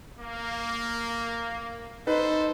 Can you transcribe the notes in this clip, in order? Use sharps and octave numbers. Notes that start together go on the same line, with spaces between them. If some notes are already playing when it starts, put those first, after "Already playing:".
A#3
D#4 A4 B4 C5 D#5